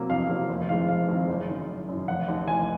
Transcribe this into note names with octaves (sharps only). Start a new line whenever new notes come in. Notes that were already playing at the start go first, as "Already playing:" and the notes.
Already playing: C3 F#3 A#3
F2 F5
C3 F#3 A#3
F1
F2 D#3 G#3 C4 F5
F1 F5
F2 D#3 G#3 C4
F#1
F#2 D#3
F#1
F#2 D#3
F1 F#5
D#2 D#3
F1 G#5